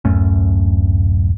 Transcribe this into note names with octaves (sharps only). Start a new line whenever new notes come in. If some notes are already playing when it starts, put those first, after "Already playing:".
D1 F#2 A3 C#4